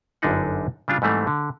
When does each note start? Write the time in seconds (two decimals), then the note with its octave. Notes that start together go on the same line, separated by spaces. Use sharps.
0.22 G1 F#2 D3 D4 D#4 F#5
0.88 C#3 G3 D4 F4
1.02 G#2 E3 G3 A3 C4
1.27 D3